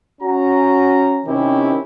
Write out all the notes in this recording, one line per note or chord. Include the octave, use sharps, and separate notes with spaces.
C#4 F#4 A#5
C3 D#3 C4 C#4 E4 G4